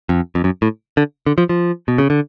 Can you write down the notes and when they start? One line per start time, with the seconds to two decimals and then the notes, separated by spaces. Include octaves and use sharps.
0.09 F2
0.35 F2
0.44 F#2
0.62 A2
0.97 D3
1.27 D3
1.38 F3
1.49 F3
1.88 B2
1.98 C#3
2.10 D3